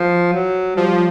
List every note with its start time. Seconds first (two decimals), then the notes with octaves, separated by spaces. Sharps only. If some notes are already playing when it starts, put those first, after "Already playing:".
Already playing: F3
0.33 F#3
0.76 F3 G3